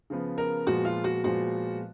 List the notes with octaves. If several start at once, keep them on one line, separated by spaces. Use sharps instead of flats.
C#3 F3 B3
A#4
A#2 F3 G#3 B3 F#4
F4
F#4
A#2 F3 G#3 B3 F#4